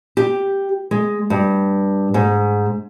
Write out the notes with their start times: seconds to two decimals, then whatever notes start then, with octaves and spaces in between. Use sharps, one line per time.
0.17 G4
0.91 G#3
1.30 G2
2.14 G#2